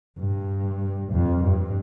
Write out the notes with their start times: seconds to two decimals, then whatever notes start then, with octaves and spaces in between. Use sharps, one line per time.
0.19 G2
1.12 F2
1.44 G2